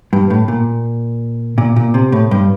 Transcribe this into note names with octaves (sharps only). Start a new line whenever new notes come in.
G2
A2
A#2
A#2
A#2
C3
A2
G2